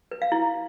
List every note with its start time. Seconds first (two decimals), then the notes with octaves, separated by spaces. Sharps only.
0.11 B4
0.22 F5
0.32 E4